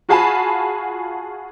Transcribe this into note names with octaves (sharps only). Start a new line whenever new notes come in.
F4 F#4 G#4 G#5 A5 B5